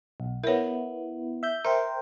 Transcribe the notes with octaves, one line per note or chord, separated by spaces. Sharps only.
B1
B3 E4 A#4 C#5
E5 G6
A#4 C5 E5 G5